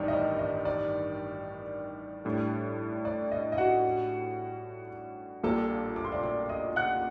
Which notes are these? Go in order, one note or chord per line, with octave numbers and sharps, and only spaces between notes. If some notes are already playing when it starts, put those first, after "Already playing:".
Already playing: A1 G2 D#3 G3 D5
D#5
D5
D#5
D5
A2 G3 D4
D5
D#5
D#5
F#4 F#5
A#1 A#2 G3 A#3 A4 A5
D6
C6
D5 D6
D5 D6
D#5 D#6
F#5 F#6